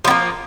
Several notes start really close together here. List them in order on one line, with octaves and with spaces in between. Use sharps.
F3 B3 A#3